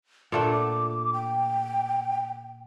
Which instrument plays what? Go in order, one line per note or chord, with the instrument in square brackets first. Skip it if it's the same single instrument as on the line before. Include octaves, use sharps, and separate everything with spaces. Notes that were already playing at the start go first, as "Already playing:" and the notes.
[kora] A#2 A3 D4 [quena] F#5
[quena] D6
G5